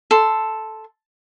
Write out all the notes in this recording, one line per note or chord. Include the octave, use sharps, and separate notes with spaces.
A4 C6